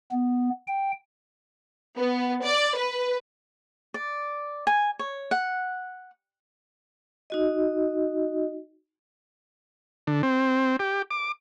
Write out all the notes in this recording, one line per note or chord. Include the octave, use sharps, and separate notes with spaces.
B3
G5
B3
D5
B4
D5
G#5
C#5
F#5
D#4 F#4 D#5
D3
C4
G4
D6